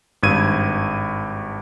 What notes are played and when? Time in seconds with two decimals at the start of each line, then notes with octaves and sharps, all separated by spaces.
0.23 G#1 G2 G#6 D#7